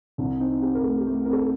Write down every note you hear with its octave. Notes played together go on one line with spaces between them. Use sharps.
C2 D4
C4 D#4
C4 G4
A#4
A3 A4
G4
A3
C4 A#4
A4